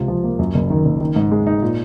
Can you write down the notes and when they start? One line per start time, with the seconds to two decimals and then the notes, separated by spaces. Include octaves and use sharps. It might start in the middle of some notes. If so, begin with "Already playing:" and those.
Already playing: C#2 C3 F4
0.08 F3
0.24 A#3
0.39 F#2
0.54 F#1
0.70 D#3
0.85 F#1
1.01 D#3
1.16 G#2
1.32 G#3
1.47 D#4
1.62 A#2